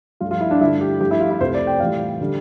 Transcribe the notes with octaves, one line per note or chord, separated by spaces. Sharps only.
G2 F3 A3 F4
F4
E4
D4
G2 D3 A3 E4
G4
G2 F3 A3 G4
E4
F4
E4
F2 C3 F3 A3 C5
D5
G5
A2 E3 G3 F5
D3 G3